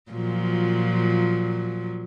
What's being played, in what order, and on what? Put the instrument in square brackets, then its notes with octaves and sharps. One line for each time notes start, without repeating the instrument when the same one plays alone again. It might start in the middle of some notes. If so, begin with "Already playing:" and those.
[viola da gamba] A#2 F3 F#3